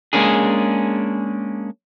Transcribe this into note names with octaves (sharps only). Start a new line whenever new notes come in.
G#3 A#3 C#4 D4 G#4